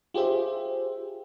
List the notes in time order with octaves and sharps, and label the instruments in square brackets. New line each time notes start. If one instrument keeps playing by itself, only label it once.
[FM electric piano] F4 G4 G#4 C5 E5